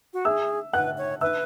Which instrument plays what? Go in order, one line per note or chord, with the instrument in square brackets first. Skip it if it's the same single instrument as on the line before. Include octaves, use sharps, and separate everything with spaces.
[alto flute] F#4
[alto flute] G#4 [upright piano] E5 E6
[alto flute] B4 [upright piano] F#5 F#6
[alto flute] C#5
[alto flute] B4 [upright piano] E5 E6